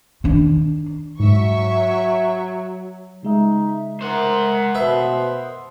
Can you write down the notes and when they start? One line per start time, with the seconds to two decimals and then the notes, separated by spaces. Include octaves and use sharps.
0.24 D#3 D4
1.20 G#2 F#3 E5 C#6
3.23 C#3 G#3 D#4 E5
4.01 A#4 C5 F#5
4.75 B2 A#4 B4 E5 D#6